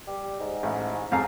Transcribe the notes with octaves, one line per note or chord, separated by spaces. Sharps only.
G3
G#2
A1
F2 G#4 F5 A#5